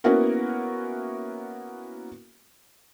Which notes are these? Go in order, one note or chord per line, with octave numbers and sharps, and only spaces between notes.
A#3 B3 C#4 E4 F#4 A#4